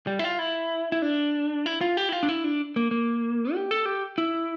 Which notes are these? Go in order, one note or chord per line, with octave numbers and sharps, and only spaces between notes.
G3
E4
F4
E4
E4
D4
E4
F4
G4
E4
F4
D4
E4
D4
A#3
A#3
G4
A4
G4
E4